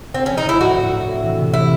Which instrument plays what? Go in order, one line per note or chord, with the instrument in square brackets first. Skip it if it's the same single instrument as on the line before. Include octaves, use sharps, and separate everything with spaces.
[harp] D2 [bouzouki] C4
[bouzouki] C#4
[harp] F3
[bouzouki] D#4
[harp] D2 [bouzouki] E4
[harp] A2 [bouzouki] F#4
[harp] A2
A2
C4
E3
C3
[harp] A3 [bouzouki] E4